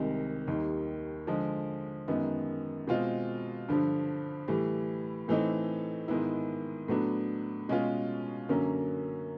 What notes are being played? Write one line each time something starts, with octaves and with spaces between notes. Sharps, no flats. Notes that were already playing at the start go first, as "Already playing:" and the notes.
Already playing: C2 C3 D#3 G#3
D#2 D#3 G3
D3 F3 G#3
F#2 D#3 G#3 B3
B2 G#3 C4 F4
G2 D3 F3
A2 E3 G3
A2 E3 A3 C4 D#4
G#2 D#3 G#3 B3 E4
A2 F#3 B3 D4
B2 G#3 C#4 F4
F#2 D3 F#3 A#3 C#4